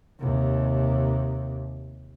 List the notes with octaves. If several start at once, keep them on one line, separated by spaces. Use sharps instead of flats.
D#2 C3